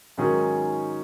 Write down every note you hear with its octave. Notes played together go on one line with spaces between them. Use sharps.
G#2 D#3 F#3 C#4 G#4